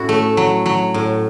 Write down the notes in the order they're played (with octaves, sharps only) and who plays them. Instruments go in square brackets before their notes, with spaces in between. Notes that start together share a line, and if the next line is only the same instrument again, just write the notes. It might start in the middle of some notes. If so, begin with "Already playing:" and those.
Already playing: [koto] A2 C#4 E4 F#4
A3
F#3
F#3
A2